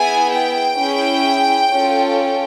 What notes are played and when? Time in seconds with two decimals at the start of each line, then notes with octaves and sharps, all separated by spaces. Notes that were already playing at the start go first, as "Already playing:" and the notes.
Already playing: B3 E4 G#4 G#5
0.32 G5
0.78 C#4 E4 G#4
1.72 C#4 F4 A4